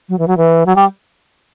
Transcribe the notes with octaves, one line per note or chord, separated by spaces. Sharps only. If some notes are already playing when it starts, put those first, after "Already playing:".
F#3
E3
F#3
E3
F#3
G3